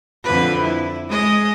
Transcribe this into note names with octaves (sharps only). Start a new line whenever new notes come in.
F2 D3 B4
E4
G#3 D#5